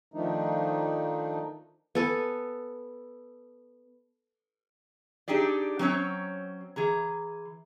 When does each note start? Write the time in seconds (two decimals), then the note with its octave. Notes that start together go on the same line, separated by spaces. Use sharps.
0.14 D#3 F3 A3 D4 D#4
1.95 B3 A4 G#5
5.28 D4 D#4 G4 G#4 D5
5.79 F#3 C4 C#4 C#5
6.76 E3 G#4 A#5